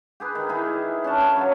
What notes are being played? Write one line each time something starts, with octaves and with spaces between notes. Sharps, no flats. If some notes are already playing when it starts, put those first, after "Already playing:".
G4 G#4 B4
D#3
D#3 E4 G#4
C#4 D4 A5
C#5 B5
F#3 F5 A5